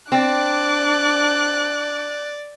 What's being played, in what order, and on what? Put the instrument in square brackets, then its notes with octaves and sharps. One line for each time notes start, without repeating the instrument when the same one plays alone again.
[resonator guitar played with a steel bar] C4 [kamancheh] D4 D6 [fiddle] D5 [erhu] F#6